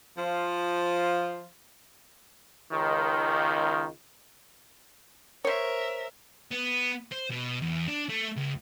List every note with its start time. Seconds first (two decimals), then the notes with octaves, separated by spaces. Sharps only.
0.18 F3 F4
2.72 C#2 D#3
5.45 A#4 C5 C#5 E5
6.51 B3
7.12 C5
7.31 B2
7.62 E2
7.88 D4
8.09 A3
8.36 C#2